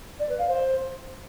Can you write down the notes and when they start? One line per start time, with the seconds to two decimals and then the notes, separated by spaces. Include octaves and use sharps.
0.19 D5
0.29 B4
0.38 F5
0.48 C5